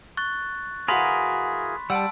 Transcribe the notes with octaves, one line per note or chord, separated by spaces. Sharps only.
C#6 F#6 A6
E3 F#4 G#4 A#4 F5 B5 C6 B6
G3 F#5 A5 E6 D7